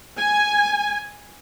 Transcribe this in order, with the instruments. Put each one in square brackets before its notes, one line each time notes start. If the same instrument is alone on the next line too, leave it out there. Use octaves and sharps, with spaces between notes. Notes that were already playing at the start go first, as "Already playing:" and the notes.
[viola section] G#5